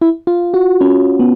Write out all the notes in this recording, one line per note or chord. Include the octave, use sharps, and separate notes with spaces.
E4
F4
F#4
C#4
B3